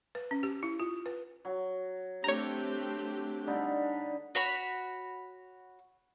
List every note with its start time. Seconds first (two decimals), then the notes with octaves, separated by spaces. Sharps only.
0.15 B4
0.31 C#4
0.43 G4
0.63 E4
0.80 F4
1.06 B4
1.45 F#3
2.24 A3 C4 D4 G4 C#5 A#5
3.47 D3 G3 D#4
4.35 F#4 C#5 B5